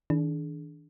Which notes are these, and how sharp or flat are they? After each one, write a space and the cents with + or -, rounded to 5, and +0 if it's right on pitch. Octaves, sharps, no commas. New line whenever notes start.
D#3 +35 D4 -15 G#4 +40